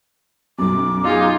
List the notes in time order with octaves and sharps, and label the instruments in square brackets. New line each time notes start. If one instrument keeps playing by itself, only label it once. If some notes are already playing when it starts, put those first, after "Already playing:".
[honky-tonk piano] B1 F#2 [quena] D6
[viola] D#4 F4 [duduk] G#4